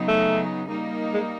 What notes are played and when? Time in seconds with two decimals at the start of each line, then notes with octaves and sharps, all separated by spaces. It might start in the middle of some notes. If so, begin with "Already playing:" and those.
Already playing: C#3 F#3 B3 D#4
0.08 A3
0.68 G3 A#3 D#4
1.14 G#3